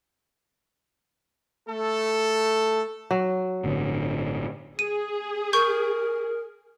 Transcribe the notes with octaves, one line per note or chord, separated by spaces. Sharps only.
A3 A4
F#3
G1 A2 D3
G#4 D#7
A#4 C#6 G6